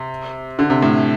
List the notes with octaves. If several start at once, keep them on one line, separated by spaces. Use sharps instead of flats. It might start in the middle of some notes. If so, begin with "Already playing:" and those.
Already playing: C3
D3
C3
A2